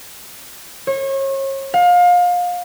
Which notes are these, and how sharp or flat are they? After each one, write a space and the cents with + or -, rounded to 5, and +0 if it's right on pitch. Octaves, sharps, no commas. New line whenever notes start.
C#5 -35
F5 +30